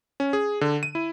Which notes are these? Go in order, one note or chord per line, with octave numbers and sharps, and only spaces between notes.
C#4
G#4
D3
D#7
E4